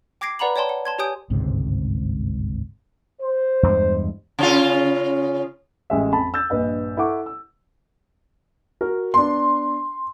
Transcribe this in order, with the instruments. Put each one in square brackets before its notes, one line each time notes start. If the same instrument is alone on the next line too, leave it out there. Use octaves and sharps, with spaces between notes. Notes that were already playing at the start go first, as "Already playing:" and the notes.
[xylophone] G5 D6 G#6 A#6 C7 D7
B4 D5 F#5 A#5 B5 F#7
C#5 D5 G5 A5 C6
F#5
A5 C6 G#6
G4 C#5 G#5 D#6 G6 D7
[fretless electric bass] G1 C#2 G#2 C3
[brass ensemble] C5
[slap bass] E2 G2 G#3
[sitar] C#3 C#4 F4
[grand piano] A1 G#3 E5
F2 A5 B5
E6 G6 A6
A#1 G2 B4 D#5
E4 A4 F#5 C#6 D6
E6
F#4 A#4
[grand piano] B3 D4 [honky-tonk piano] C6